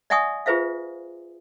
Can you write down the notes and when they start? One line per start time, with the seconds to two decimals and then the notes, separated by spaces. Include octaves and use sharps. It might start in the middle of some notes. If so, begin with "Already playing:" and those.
0.10 D5 E5 F#5 G#5 C#6 D#6
0.46 F4 G#4 B4 C5 E5 F5